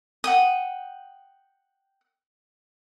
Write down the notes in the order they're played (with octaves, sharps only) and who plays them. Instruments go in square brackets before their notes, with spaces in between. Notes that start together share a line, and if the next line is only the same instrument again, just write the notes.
[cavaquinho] F#5 G5 D#6